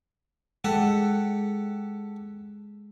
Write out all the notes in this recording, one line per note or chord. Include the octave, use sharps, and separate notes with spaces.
G#3 G4 A4 F#5